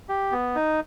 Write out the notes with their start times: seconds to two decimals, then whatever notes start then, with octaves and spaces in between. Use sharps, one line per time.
0.09 G4
0.32 B3
0.55 D#4